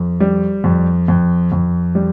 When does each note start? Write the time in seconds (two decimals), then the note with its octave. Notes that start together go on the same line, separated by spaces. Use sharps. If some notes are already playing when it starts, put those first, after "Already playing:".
Already playing: F2
0.20 G3
0.64 F2
1.08 F2
1.52 F2
1.95 G3